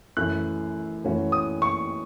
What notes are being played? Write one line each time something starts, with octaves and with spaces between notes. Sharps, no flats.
F#2 E3 A3 F#6
F#2 E3 A3 C#4 F#4
D#6
C#6